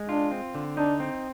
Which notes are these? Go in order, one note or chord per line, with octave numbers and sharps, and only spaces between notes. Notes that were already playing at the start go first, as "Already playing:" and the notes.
Already playing: G#3
D4 F4
C4
D3
D4 D#4
C4